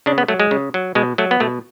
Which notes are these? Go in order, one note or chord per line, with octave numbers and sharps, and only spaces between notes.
C#3 D4
B3
F#3 A3
G#3
C#3
F#3
B2 G#3
F#3 A3
B3
B2 A3